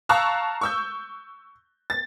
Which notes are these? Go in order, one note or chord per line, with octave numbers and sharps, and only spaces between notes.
F5 A5 A#5 C#6 E6 F#6
C#6 E6 G6
A6